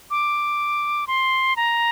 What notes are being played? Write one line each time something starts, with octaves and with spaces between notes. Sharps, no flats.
D6
C6
A#5